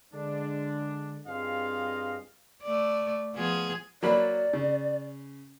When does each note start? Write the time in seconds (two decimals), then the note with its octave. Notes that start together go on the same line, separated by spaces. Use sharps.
0.13 D3 G#3 D4
1.26 G2 C4 F4 G#4 D#5 F5
2.62 A3 D5
3.35 F3 B3 G#4
4.03 F#3 A#3 D5 B5
4.53 C#3